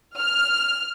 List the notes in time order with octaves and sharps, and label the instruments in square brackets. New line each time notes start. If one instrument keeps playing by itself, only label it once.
[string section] F6